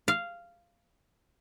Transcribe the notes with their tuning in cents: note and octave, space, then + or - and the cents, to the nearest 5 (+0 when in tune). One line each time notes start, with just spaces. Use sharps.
F5 -10